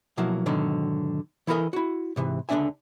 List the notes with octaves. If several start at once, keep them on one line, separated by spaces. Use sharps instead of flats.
B2 F3 F#3 A#3 E4 F#4
G#2 B2 D3 D#3 F#3
E3 E4 A4 A#4 D#5 G#5
E4 F#4
G#2 C3 E3
C#2 D3 D#3 D4 E5 G#5